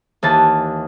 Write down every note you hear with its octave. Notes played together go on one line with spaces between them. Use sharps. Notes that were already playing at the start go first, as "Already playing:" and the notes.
D#2 E3 A5